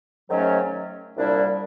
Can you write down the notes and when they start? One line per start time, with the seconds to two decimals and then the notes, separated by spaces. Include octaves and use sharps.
0.29 G#2 D#3 F#3 A3 C#4
1.17 C2 A#2 G3 D4 E4